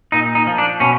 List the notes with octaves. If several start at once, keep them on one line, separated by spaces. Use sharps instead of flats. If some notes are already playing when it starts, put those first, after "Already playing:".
A#2 D#4
D#4
F3
D4
B2 C#4